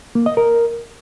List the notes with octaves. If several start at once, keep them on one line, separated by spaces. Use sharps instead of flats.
A#3
D#5
A#4